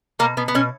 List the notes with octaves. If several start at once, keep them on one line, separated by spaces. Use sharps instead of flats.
B2 A#3
B2 B3
B3
B2 C#4